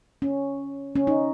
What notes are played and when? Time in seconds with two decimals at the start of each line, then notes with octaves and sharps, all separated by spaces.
0.22 C#4
0.96 C#4
1.07 D#4